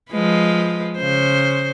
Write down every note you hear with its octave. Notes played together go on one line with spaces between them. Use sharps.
F3 G#3 B4
C#3 C5